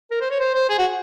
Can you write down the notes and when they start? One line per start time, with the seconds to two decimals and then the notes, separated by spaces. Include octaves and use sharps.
0.11 A#4
0.21 C5
0.30 C#5
0.40 C5
0.54 C5
0.69 G#4
0.79 F#4